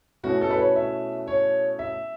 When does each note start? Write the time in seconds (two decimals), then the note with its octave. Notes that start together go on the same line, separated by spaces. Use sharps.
0.23 B2 A3 C#4 E4 F#4
0.41 A4
0.50 B4
0.58 C#5
0.76 E5
1.27 C#5
1.79 E5